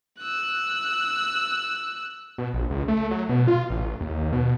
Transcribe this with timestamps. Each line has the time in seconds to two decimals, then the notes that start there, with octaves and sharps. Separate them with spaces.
0.19 E6 F#6
2.38 B2
2.53 A#1
2.70 C#2
2.88 A3
3.11 F#3
3.29 B2
3.47 F4
3.70 A1
4.01 D#2
4.33 B2